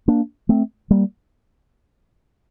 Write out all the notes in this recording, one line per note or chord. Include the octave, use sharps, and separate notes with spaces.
A#3 D4
A3 C4
G3 A#3